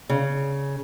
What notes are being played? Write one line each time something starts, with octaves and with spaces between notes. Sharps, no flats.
C#3